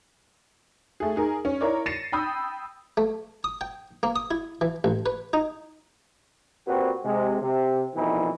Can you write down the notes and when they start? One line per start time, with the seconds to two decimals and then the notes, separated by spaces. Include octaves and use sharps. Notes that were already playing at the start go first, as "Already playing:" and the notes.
1.00 A3 G#4
1.16 D#4 G#4 A#4
1.45 C#4
1.61 E4 A#4 C#5 D5
1.86 A6 A#6 C7 C#7 D#7 E7
2.12 G5 B5 D#6 E6 G6
2.97 A3
3.44 D#6
3.61 G5
4.03 A#3
4.16 D#6
4.31 E4
4.61 E3
4.84 A1
5.06 B4
5.33 D#4
6.66 A#2 C4 F#4 G4 B4 C5
7.03 C3 G#3
7.41 C3
7.95 C2 F2 B2 E3 F3 D#4